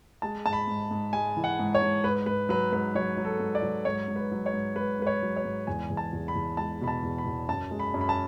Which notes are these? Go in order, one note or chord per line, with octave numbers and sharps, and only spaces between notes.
G#3 A5
G#2 A5
B5
G#2
G#2
G#3 G#5
E3
F#5
G#2
C#5
G#2
G#2 B4
G#2 B4
F#3 B4
G#2 B4
F#3 C#5
F#3
A4
G#2
D5
F#3
G#2 C#5
G#2
B4
F#3
C#5
G#2
G#2 B4
G#2 B4
C#5
F#3
C#5
G#2
E2 G#5
E2
A5
E2
B5
E2
G#3 A5
B2 B5
A5
E2
B5
E2
F#2 A5
G#3
B5
F#2
B5
A5